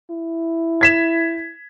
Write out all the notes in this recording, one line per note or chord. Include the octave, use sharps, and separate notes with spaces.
E4
G#6 B6 E7